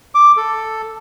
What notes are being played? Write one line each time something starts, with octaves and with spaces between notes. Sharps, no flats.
D6
A4